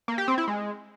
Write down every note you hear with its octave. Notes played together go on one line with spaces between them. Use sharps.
A#3
G4
C4
E4
G#3